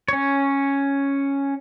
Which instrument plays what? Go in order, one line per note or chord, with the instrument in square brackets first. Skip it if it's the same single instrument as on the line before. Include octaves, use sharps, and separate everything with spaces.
[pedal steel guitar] C#4 C#5